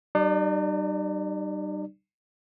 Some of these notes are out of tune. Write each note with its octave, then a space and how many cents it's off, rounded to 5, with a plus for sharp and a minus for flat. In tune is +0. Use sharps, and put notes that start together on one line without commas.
G3 -30 D#4 -45 D5 +0